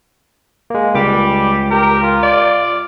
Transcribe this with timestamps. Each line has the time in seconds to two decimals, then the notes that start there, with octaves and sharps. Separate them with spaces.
0.70 G#3 A#3
0.95 C#2 G3 G4 D6
1.71 G4 A#4
2.02 F4
2.23 D5